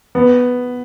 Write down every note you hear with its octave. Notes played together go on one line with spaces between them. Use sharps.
B3